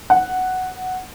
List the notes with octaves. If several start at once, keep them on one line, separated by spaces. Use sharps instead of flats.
F#5